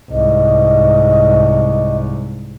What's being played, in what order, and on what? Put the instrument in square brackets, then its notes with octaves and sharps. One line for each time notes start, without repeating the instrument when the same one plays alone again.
[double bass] C2 G#2 [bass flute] D#5